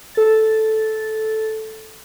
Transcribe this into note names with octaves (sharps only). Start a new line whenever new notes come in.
A4 A6